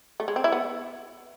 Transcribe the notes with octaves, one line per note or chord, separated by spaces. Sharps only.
A3
G#3
C4
E4
B3